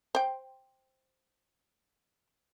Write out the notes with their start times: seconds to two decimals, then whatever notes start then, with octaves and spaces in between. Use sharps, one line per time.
0.15 C5 G5